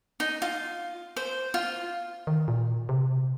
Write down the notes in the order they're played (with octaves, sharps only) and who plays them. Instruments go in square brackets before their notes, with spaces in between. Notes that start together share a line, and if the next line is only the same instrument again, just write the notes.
[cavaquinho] D#4
F4
C5
F4
[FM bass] D#3
A#2
C3